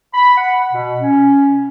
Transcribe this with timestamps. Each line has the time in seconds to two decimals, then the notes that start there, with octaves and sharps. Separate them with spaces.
0.14 B5
0.37 F#5
0.73 B2
1.01 C#4